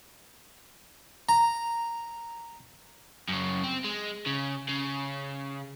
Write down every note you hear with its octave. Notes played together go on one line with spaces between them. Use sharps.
A#5
F#2 C#3
C4
G#3
C#3
C#3